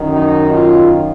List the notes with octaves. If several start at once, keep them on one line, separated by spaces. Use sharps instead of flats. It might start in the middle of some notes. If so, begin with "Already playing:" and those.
Already playing: F#2 D#3
D#4
F4